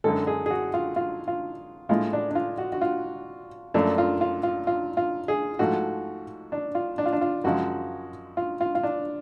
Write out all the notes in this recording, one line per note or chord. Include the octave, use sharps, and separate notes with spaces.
F#2 D3 G#3 A4
G#4
G#4
F#4
F4
F4
F4
A2 G#3 F4
D4
D4
F4
F#4
F#4
F4
F#2 F3 A3 D4
F4
F4
F4
F4
F4
G#4
G#2 F3 A3 F#4
D4
F4
D4
F4
D4
F4
F#2 C#3 F3 G#3 F#4
F4
F4
F4
D4